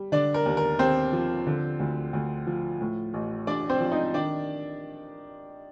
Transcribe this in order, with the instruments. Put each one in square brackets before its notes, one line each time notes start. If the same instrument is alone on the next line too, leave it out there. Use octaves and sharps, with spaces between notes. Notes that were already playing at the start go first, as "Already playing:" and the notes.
Already playing: [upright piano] G3
D3 D4 D5
A#4
D#2
A#4
D#2 C4 C5
F3
D3
D2
D2
F3
A2
A1
A1 D4 D5
C4 C5
F3
D#4 D#5
D#3 D4 D5